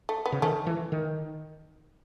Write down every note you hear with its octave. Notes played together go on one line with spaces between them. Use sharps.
A3
B3
C#3
D#3 A3 C#4
E3
D#3